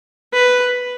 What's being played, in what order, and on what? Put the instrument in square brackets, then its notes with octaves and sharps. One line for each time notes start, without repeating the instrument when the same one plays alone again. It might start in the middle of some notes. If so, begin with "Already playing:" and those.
[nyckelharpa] B4